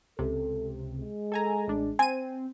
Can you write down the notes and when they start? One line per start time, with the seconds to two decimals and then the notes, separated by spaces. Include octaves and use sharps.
0.19 C#2 C3 A4
0.98 G#3
1.32 A4 G#5 A#5
1.67 A1 D4
1.99 C4 G#5 D#7